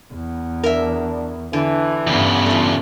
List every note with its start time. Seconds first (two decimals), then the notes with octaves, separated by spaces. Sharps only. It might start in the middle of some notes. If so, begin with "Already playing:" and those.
0.14 E2
0.64 D4 A#4 E5
1.53 D3 E3
2.07 E2 G2 C#3 B3
2.46 A3 F4